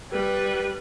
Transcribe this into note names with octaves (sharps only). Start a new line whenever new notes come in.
G3 B4